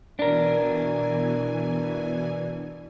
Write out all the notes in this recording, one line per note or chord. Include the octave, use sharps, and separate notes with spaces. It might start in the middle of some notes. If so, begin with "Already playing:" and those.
B2 E3 D4 A#4 G#5